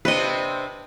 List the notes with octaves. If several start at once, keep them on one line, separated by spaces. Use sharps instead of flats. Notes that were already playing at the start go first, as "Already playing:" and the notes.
C3 C4 D4 B4 D#5